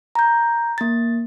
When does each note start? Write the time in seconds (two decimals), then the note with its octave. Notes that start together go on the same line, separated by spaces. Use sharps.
0.15 A#5 G6
0.78 A#3 A6